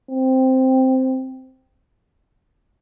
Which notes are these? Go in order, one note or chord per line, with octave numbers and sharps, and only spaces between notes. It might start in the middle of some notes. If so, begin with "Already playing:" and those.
C4